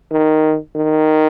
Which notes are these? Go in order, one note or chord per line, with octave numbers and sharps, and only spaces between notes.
D#3
D#3